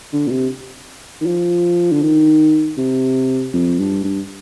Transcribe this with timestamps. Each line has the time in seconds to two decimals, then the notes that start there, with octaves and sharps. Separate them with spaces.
0.13 D3
0.27 A#2
0.31 C3
1.21 D#3
1.26 F3
1.92 D3
2.02 D#3
2.77 C3
3.53 F2
3.79 G2
4.04 G2